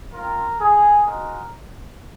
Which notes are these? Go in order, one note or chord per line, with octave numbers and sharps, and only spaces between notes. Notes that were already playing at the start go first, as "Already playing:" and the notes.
C4 F4 A#4
G#4
G#3 D#4 F#4 A#4